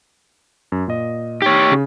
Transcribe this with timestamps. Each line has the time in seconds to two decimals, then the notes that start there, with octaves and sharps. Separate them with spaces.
0.72 F#2
0.88 A#2 D#5
1.42 D#4 G4 C#5
1.72 C#3